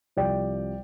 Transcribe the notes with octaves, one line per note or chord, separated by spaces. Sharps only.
C2 C3 F3 D5 G5